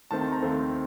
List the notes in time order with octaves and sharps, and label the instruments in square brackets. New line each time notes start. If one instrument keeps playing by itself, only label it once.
[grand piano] D#2 D#3 A3 C4 A5
A5
A#5
D#2 D#3 A3 C4